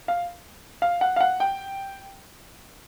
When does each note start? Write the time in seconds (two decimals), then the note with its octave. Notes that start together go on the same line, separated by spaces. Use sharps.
0.08 F5
0.82 F5
1.01 F#5
1.16 F5
1.21 F#5
1.40 G5